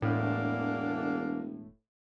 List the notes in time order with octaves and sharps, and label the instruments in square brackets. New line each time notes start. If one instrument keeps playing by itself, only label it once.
[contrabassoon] E1 [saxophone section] E2 A#3 D4 [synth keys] A2